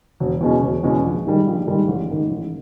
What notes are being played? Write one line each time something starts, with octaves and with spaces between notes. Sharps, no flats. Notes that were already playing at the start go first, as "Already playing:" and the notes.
E1
E2 B2 G#3 C#4
E1
E2 B2 G#3 C#4
A#1
G#2 D#3 G3
A#1
G#2 D#3 G3
A1
G#2 D#3
A1